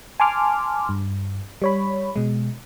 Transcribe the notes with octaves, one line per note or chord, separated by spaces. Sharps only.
G#5 A5 C6 D6 F6
G2
G3 C#5 B5
B2 G#3